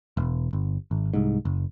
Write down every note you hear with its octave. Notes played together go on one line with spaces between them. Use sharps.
E1
G1
G#1
C2 G#2
F#1